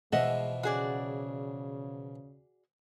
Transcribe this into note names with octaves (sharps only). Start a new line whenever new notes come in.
B2 E3 F3 G#3 D#5 E5 F#5
C#3 F#4 G#4 D5